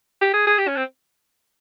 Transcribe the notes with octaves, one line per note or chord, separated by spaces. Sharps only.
G4
G#4
G#4
G4
C#4
C4